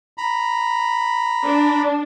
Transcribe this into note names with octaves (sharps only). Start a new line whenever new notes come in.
A#5 B5
D4